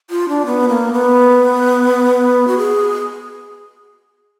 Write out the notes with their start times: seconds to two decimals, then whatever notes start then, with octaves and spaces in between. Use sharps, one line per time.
0.10 F4
0.29 D4
0.46 B3
0.69 A#3
0.93 B3
2.48 F#4
2.58 G#4